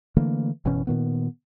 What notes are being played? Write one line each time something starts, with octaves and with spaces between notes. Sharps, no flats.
D3 E3 A3 A#3
F#1 B2 E3 C#4
A#2 D#3 B3